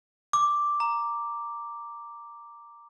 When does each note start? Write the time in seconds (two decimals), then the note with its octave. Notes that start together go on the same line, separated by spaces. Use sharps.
0.33 D6
0.80 A#5